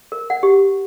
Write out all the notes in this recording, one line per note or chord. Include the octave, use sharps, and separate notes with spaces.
A#4
F#5
G4